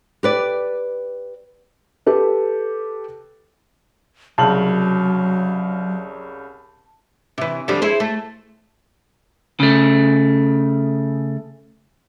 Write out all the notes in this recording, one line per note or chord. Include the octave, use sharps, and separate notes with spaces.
G4 B4 D5
G4 A4 B4
C2 C#3 F#3 A5 F#7
C3 E3
D3 F3 G3
E4 G#4 C5
A3
C#3 A3